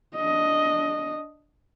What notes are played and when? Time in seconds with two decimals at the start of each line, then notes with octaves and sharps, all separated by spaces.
0.16 D4 D#5